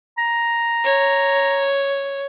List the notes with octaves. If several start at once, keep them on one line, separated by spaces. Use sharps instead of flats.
A#5
C#5